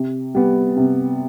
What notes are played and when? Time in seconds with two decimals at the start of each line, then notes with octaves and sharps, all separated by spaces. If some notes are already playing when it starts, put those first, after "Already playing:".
Already playing: C3
0.34 G3 B3
0.76 C3